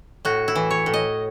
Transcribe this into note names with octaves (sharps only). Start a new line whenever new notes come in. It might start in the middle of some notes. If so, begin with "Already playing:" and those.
A2 F#4
E4
E3
C#5
A2
D#5